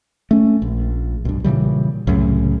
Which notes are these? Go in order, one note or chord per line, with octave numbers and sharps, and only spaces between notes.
A3 C#4
A#1
B1 G2
A#2 C#3 E3 G3
C2 F#2 A2 C#3